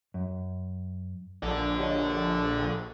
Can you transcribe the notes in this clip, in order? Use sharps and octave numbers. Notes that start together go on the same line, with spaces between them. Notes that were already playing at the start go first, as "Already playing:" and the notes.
F#2
A#1 A4 D5
G4 C#5 D#5